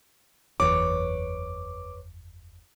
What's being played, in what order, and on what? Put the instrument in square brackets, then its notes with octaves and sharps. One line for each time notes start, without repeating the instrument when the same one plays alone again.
[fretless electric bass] F#1 E2 [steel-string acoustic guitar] B4 C#5 [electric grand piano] D6